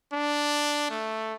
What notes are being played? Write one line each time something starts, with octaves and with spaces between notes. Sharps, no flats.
D4
A3